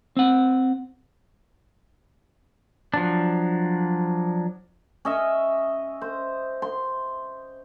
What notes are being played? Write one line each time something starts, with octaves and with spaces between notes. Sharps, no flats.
C4 F#5
F3 F#3 D4
C#4 D#5 E5
C5
C6